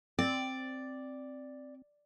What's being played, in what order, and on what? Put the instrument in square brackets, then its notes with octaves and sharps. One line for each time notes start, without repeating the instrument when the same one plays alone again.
[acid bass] C4 [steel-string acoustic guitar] D5